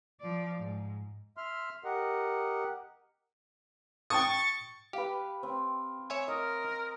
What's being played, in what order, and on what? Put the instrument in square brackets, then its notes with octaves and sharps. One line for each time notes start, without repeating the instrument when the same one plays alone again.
[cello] F3 D5
G#2
[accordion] E5 C6 F6
G4 A#4 D#5 F#5
[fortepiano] G5 A5 D#6 [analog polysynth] C#6 A6
[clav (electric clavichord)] G4 [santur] B4 F5
[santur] C4
[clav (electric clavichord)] C#5 E5 G#5
[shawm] A#4 [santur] D#5